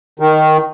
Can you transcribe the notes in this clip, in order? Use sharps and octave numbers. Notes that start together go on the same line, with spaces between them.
D#3